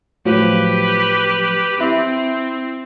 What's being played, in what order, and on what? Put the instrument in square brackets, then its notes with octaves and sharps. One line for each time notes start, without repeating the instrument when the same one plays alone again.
[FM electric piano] A2 F3 F#3 [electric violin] G4 B4
[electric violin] C4 [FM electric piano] E4